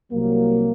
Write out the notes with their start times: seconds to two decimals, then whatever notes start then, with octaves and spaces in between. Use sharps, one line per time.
0.12 C2 C3 F#3 A#3